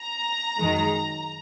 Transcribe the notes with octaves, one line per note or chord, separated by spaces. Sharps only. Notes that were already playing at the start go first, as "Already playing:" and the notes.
Already playing: A#5
F#2 D#3 G#3